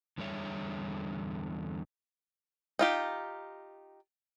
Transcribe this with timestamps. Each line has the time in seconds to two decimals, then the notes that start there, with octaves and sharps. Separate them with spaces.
0.18 E2 D3 G3 G#4 C#5 E5
2.79 D#4 F4 G4